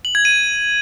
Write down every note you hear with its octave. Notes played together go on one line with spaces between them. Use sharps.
F#7
G#6
D#7